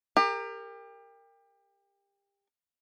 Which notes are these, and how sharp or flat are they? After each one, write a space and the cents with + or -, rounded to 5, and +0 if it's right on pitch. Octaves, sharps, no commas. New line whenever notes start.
G4 +30 A#4 -15